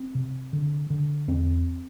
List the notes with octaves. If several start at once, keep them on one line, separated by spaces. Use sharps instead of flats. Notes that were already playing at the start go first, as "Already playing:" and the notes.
Already playing: C4
C3
D3
D3
E2 C4